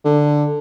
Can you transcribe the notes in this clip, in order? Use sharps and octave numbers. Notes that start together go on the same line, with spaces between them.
D3